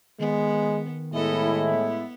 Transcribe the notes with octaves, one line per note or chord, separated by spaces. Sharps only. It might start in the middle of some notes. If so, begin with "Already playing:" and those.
D#3 G#3 B3
A2 G#3 B3 E4 A4 D#5
B3